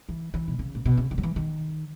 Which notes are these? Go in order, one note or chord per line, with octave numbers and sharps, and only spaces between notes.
E3
E3
B2
C#3
A#2
B2
C#3
D#3
F#3
E3
D#3